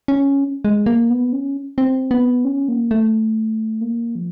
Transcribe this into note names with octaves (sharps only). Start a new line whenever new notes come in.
C#4
G#3
A#3
B3
C#4
C4
B3
C#4
A#3
A3
A#3
F3